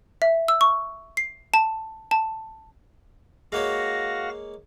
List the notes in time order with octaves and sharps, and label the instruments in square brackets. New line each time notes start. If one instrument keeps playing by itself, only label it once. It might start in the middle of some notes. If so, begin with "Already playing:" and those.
[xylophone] E5
E6
C#6
C7
A5
A5
[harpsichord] G#3 A#3 C#5 [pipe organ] F#4 F5 A#6